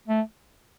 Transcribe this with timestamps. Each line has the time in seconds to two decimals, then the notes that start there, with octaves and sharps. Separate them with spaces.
0.08 A3